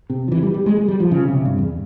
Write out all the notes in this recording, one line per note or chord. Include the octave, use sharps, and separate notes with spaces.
C3
F3
E3
G3
G3
G#3
G#3
G3
F3
C#3
C3
G2
E2